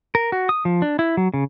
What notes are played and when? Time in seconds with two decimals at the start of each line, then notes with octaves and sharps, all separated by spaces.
0.15 A#4
0.32 F#4
0.49 D#6
0.65 F3
0.82 D4
0.99 E4
1.17 F#3
1.34 C#3